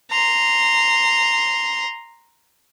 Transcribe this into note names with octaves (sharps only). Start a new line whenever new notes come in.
A#5 C6